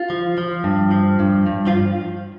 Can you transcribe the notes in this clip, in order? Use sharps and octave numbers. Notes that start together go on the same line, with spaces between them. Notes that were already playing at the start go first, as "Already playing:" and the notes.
Already playing: F4
F3
F3
G2
F3
G2
G2
F3 F4